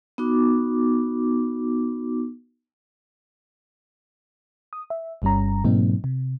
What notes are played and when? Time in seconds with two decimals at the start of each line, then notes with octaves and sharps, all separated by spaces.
0.18 B3 D#4 F#4 D6
4.73 D#6
4.90 E5
5.22 G1 G2 G3 C#4 A#5
5.64 G#2 B2 F#3 A#3 C4 D#4
6.04 C3